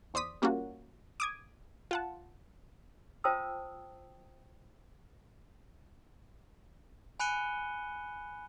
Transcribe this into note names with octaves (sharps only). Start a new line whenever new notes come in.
E2 C5 D5 D#6 B6
G3 A#3 C#4 F4 F#4
D6 D#6 G#6
F4 F#5 A5
F4 C5 G5 A5 D#6 E6
G#5 B5 F#6 C#7 D#7 G7